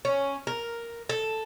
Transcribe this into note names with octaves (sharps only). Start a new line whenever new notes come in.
C#4
A#4
A4